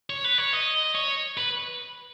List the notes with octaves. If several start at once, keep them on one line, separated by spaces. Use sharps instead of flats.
C#5
B4
C#5
D#5
C#5
B4